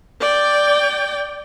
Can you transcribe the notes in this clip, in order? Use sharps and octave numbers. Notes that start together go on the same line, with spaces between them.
D5 G5